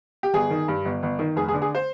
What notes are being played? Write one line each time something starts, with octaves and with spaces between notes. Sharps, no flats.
G4
G1 G#4
D#3
G2
G1
G1
D#3
F1 G#4
G#4
D3
G#4
C5